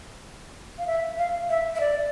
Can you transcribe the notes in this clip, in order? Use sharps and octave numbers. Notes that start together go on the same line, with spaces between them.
F5
E5
F5
E5
E5
D5